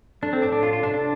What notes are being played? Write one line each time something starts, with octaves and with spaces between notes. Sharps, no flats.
A3 D4
C4
A2 D4
D4
A3 F4
F4
C3 D4
D4